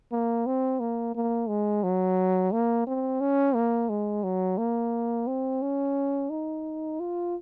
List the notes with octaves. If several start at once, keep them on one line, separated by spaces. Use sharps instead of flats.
A#3
C4
A#3
A#3
G#3
F#3
A#3
C4
C#4
A#3
G#3
F#3
A#3
C4
C#4
D#4
F4